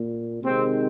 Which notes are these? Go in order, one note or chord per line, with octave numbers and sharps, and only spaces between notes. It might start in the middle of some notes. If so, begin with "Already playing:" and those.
Already playing: A#2
C3 D#3 G#3 C4